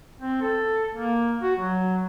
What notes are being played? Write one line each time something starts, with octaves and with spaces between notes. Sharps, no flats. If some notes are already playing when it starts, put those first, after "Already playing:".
C4
A4
A#3
F#4
F#3